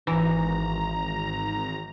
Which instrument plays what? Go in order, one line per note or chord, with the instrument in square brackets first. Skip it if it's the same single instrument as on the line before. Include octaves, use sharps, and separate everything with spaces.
[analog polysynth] G#1 A#5 [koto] E3